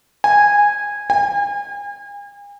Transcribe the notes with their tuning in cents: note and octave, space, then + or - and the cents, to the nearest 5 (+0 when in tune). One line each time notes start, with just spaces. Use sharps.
G#5 -10
G#5 -40